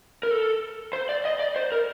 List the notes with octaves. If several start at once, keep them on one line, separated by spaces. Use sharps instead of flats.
A#4
A4
C5
D5
D#5
D5
C5
A#4